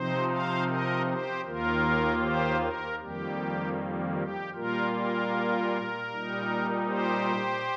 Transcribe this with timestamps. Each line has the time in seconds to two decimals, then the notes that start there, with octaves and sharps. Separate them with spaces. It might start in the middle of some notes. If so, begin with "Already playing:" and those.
Already playing: C3 F3 C4 D#4 C5
0.29 C5 F5
0.67 A#4 D#5
1.06 G4 C5
1.45 D#2 D#3 A#3 F4 A#4
2.22 G4 C5
2.60 A#4
3.00 F2 D#3 G3 A#3 G4
4.15 G4
4.54 A#2 G3 A#3 F4 A#4
4.92 A#4
6.08 A#2 G3 D#4
6.86 G4 C5